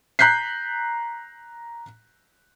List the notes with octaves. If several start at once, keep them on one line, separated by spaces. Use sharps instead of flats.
A#5 F#6 G6 B6 C7